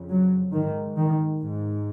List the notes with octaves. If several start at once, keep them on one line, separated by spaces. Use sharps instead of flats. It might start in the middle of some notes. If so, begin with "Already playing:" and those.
Already playing: F2 C#3
F#3
G#2 D#3
D#3
G#2